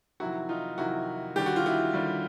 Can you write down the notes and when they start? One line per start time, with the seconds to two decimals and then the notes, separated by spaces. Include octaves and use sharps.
0.20 F2 C3 D#3 F#3 E4 F#4
0.49 D#4 F4
0.78 F2 C3 D#3 F#3 E4 F#4
1.36 D#2 D3 G3 G4
1.46 F#4
1.56 F4
1.66 E4 F#4
1.94 D#2 D3 G3